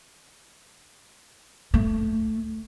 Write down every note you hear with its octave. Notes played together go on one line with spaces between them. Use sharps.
A3